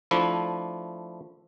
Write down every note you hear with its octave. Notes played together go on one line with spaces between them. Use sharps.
F3 A3 D4 E4